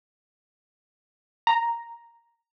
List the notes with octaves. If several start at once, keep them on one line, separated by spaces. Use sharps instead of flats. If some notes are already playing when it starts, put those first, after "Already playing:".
A#5